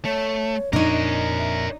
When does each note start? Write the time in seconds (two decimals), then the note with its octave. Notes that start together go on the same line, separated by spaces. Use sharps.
0.05 A3 C#5
0.73 F2 A#2 D4 D#4 A#4 C#5 D#5
1.38 E5